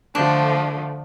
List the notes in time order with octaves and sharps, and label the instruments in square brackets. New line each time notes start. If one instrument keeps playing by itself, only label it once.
[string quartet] D3 F3 A3 [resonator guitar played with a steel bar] D4